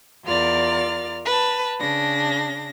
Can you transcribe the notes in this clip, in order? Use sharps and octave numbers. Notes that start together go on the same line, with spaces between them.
E2 F4 A#4 D5 F6 A6
B4 A5
C#3 D4 A#6